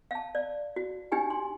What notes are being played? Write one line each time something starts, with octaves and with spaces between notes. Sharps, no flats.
F5 A5
D5
F#4
D4 D#4 G4 G5 G#5
C6